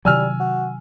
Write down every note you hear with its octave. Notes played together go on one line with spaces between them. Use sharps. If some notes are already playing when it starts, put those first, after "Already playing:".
C3 D#3 F#3 G3 G#5 E6 F6
F#4